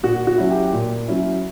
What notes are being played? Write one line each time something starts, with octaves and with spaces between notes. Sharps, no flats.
A#2 F#4
F#4
F#3 C#4 E4
G4
A#2
F#3 C#4 E4